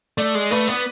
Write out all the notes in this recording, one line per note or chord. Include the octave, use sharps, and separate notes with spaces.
A3 D5
G#3
A3 B4
B3